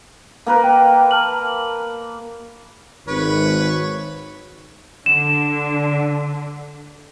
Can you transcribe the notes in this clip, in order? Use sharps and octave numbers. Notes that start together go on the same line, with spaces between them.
A#3 A#4 B4
G5
A5 F6 F#7
G#1 B4 C#5
D3 E7